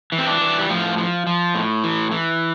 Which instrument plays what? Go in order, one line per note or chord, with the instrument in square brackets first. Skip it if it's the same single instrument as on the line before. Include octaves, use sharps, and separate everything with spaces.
[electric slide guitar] E3
C4
D4
E3
G3
A2 F3
F3
F3
A2
E3
E3